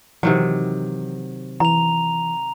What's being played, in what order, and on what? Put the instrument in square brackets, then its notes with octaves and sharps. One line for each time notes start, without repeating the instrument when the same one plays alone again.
[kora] C3 D#3 F#3 [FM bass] E3
[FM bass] E3 [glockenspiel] A#5 F7